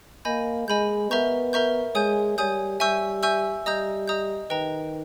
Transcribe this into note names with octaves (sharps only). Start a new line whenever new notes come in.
A#3 D#5 G#5 B5 G6
G#3 D#5 G#5 B5 G6
B3 A#4 E5 A#5 C#6 G6
A#4 E5 A#5 C#6 G6
G#3 C#5 G#5 D#6 G6
G3 C#5 G#5 D#6 G6
G3 E5 G#5 C#6 E6 G6
E5 G#5 C#6 E6 G6
G3 D#5 A#5 D#6 G6
D#5 A#5 D#6 G6
D#3 B4 D#5 G5 A#5